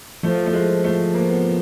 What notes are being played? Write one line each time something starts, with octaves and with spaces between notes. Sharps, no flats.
F3 A3
A3
G#3
A3
A#3
B3